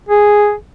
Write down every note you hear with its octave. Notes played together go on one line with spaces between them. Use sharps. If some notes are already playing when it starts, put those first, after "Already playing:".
G#4